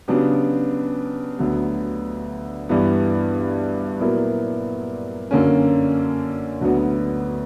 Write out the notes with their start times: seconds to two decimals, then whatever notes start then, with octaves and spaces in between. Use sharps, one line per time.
0.08 C#3 F#3 B3 D4 G4
1.39 D2 D3 F#3 B3
2.69 G2 E3 B3
4.00 A#2 F#3 B3 E4 A#4
5.31 F#2 D3 A#3 C#4
6.61 D2 D3 F#3 B3 F#4